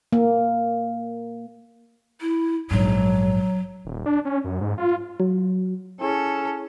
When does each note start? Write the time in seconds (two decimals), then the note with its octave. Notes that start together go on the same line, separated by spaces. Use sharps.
0.13 A#3
2.21 E4
2.71 A#1 G#2 F#3
3.85 D#1
4.06 D4
4.25 C#4
4.44 F#2
4.61 G#2
4.78 F4
5.20 F#3
6.01 C#4 E4 G#4 A4